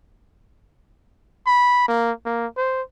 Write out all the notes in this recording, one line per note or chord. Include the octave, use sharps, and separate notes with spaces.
B5
A#3
A#3
C5